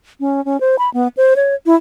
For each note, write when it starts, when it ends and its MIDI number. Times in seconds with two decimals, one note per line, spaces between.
0.20 0.43 61
0.45 0.59 61
0.61 0.76 72
0.79 0.90 83
0.94 1.08 59
1.17 1.34 72
1.36 1.55 73
1.66 1.76 64